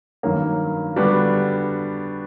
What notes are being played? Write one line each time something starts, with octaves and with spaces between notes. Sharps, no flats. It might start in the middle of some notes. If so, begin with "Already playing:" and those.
G2 D#3 F#3 A#3 C#4
D3 G3 B3 D4 F#4